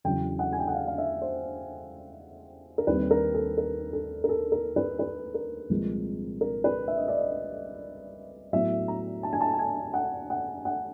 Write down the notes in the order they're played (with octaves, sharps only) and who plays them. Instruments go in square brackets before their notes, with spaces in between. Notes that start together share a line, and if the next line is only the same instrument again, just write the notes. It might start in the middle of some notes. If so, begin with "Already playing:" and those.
[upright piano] E2 C#3 F#3 G5
F#5
G#5
G5
F#5
F5
F5
E5
C5
A#4
D#2 D#3 G3 C4 B4
A#4
A4
A#4
A4
A#4
A4
A#4
B4
B4
A#4
C2 A#2 F3 G#3 C4
A#4
B4
E5
D#5
D5
D#5
A2 F#3 B3 E5
A#5
A5
G#5
A5
A5
G#5
F#5
F#5
F#5